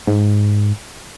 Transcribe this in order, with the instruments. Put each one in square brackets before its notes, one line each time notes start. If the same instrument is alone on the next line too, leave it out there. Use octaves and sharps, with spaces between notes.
[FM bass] G#2